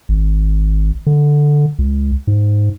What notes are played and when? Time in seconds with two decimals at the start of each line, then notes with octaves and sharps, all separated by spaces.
0.09 G#1
1.07 D3
1.79 C#2
2.27 G#2